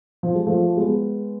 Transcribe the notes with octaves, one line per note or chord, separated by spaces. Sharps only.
F3
G#3
F3 A3
G#3 B3